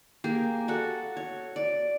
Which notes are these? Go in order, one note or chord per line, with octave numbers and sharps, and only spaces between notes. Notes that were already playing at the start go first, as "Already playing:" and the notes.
A#3 G4 G#4
F#4 A4 F#5
C#5
D5